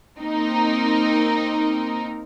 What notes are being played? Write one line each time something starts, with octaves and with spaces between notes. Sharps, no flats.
A#3 C4 D#4 A#4